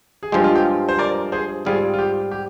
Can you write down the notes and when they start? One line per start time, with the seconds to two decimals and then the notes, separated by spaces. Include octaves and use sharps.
0.23 G#4
0.32 G2 F3 G#3 G4
0.44 F4
0.55 G4
0.89 C5
0.99 A#4 D5
1.32 G#4 C5
1.65 G#2 G3 C4 F4 G#4
1.94 F4
1.99 G4
2.32 G4